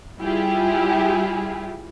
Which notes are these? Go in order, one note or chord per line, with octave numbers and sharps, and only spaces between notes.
G3 E4 F4 G4 G#4